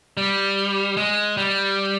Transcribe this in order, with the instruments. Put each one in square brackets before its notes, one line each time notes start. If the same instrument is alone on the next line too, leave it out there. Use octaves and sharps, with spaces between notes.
[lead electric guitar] G3
G#3
G3